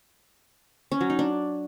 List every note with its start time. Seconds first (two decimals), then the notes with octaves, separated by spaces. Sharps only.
0.92 C#4
1.01 F#3
1.10 D#4
1.19 D4